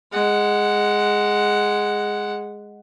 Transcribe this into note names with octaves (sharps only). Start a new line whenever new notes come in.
G#3 F#5